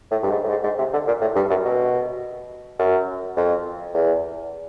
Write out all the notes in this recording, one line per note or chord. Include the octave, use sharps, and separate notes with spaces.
A2
G2
G#2
A2
G#2
G#2
C3
D3
A#2
A2
G2
F#2
B2
F#2
F2
E2